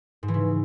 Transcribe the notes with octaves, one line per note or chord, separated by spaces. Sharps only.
G#2
E3
C#3